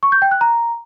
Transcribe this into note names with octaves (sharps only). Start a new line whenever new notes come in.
C#6
G6
G5
F#6
A#5